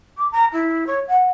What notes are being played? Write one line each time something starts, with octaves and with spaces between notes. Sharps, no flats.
D6
A#5
E4
C#5
F#5